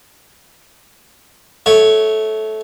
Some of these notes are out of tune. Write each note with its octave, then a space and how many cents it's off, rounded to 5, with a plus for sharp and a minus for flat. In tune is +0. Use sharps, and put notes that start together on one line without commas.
A3 -15 C#5 +0